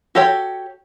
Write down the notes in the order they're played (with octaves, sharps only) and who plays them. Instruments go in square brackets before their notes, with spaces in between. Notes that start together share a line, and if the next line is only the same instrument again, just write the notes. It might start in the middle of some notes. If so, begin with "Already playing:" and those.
[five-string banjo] F#4 G4 A4 C#5 G5